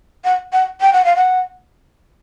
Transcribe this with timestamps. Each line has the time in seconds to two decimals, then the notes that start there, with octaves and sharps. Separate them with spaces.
0.24 F#5
0.53 F#5
0.81 G5
0.93 F#5
1.05 F5
1.16 F#5